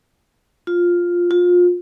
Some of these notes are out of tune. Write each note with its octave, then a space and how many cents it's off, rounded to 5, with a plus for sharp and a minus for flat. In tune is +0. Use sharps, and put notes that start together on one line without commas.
F4 +5
F4 +25